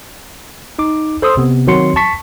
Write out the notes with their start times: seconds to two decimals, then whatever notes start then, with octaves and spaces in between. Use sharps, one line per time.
0.79 D#4 D6
1.22 A4 C5 C6 D#6 E6
1.37 C3 B3
1.67 D#3 F#3 C4 F#4 C6 C#7
1.96 A5 C#6 B6